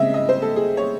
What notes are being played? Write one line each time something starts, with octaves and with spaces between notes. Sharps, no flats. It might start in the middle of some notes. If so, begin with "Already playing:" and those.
Already playing: C#3 G#3 C4 D#5 E5
D#5
C5
A4
G#4
C#5